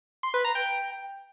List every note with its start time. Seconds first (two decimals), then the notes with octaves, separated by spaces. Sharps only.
0.23 C6
0.34 B4
0.45 A#5
0.55 G5